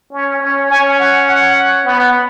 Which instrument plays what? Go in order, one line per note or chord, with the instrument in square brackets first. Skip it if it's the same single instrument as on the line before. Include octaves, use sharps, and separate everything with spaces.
[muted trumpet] C#4
C#4
[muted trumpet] C#4 [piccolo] G#5
[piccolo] F#5
F#5
[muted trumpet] B3